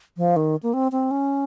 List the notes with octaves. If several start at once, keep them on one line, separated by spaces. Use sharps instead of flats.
F3
D#3
A#3
C4
C4
C#4